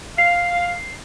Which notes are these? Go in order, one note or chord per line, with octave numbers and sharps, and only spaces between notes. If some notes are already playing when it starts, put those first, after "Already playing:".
F5 C7